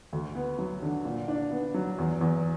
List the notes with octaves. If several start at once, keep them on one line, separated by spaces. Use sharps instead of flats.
D2
B3
F#3
D3
A#2
D4
B3
F#3
E2
E2